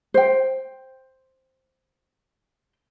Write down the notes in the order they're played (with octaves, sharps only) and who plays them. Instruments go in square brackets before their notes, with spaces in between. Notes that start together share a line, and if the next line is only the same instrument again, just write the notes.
[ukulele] C5 G5